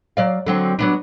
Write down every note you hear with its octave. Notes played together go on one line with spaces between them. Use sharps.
F#3 D5 F5
D3 F#3 C4
F#3 B3 D4